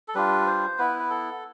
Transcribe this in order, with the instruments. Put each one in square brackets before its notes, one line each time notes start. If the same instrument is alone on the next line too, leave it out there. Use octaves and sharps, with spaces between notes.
[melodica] A4
G3 D4 F4 B4
C5
B3 E4 B4
B4
A4